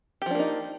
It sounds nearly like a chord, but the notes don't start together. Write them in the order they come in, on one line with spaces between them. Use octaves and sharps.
G4 F3 D4 A#3 D#4